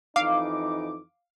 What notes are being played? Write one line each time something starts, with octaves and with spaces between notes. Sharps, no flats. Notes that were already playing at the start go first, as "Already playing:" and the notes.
F2 E3 D#4 F5 D6